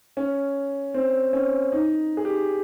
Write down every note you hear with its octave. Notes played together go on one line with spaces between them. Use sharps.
C#4
C4
C#4
D#4
G#4
G4